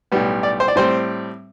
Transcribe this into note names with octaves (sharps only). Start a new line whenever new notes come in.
B1 A2 G3 B3
D5
C5
D5
A2 G3 C4 C5